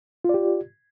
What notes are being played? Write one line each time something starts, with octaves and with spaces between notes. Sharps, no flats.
F4 G4 D5